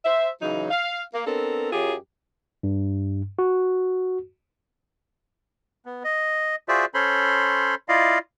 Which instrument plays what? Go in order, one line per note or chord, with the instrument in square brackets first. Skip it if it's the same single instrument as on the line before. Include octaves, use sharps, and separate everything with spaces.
[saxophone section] C5 E5
C#3 E3 F#3 D#4
F5
A#3
B3 C4 D4 A4 A#4
F#2 F#3 F4 G4 G#4
[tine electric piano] G2
F#4
[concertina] B3
D#5
F4 F#4 G#4 C5 D5 E5
C#4 A4 C5 C#5 B5 C6
E4 F4 D5 D#5 F5